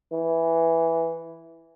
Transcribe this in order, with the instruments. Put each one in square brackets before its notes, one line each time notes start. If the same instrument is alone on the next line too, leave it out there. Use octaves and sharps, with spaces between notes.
[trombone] E3